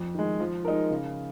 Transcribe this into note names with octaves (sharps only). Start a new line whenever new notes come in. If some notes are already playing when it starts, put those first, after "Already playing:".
Already playing: F2
D#3 G#3
F3
G#3 D#4 A#4
C#3